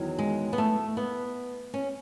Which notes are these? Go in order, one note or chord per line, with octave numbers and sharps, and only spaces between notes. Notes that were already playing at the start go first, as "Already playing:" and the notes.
Already playing: E2 D#3 F#3
G#3
B3
A3
B3
C#4